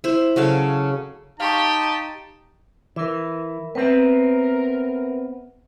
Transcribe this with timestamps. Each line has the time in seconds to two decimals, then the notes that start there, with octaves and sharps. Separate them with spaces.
0.04 E4 C5
0.36 C#3 F#3 A4 F5
1.40 D#4 G4 F5 A5 C6 C#6
2.96 E3 A#4 E5
3.75 B3 C4 A#4 B4 E5